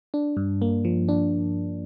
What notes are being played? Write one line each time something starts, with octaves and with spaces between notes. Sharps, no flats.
D4
G2
A#3
F3
D4